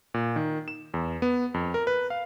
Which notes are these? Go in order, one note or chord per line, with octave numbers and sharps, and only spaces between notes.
A#2
D#3
E7
E2
B3
F2
A#4
B4
F5